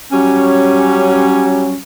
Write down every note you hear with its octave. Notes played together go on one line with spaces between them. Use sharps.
F#3 G3 C#4